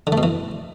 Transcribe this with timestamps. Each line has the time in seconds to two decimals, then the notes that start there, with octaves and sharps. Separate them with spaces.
0.07 D3
0.12 A3
0.18 B2
0.23 E3